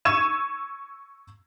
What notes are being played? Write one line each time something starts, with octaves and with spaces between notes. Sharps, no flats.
C#6 E6 G#6 D#7 E7